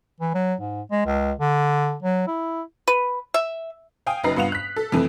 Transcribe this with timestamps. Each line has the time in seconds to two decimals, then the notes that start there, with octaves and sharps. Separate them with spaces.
0.21 E3
0.35 F#3
0.61 G#2
0.91 G#3
1.06 C#2
1.39 D3
2.03 F#3
2.28 E4
2.87 B4
3.34 E5
4.06 F5 G5 G#5 D#6
4.24 F#1 F#2 D#4 B4 A#5 C7
4.36 G2 B3 F4 F#5 F7
4.52 F#6 B6
4.76 A4
4.92 F2 C3 E3 A3